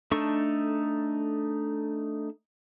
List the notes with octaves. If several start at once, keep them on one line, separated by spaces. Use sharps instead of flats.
A3 D4 D#4 A4 C#6